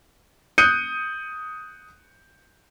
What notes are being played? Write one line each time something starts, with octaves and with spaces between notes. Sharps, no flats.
D#6 F#6 G6 C#7 D#7